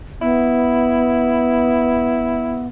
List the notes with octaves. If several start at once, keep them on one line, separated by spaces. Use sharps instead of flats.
B3 E4